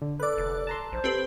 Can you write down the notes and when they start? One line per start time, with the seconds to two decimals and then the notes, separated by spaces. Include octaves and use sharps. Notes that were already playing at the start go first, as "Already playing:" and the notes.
0.02 D3
0.20 A4 B4 D5 D6 F#6
0.38 F1
0.67 A5 A#5 C6
0.92 A#1 C5
1.04 C4 G4 A4 B4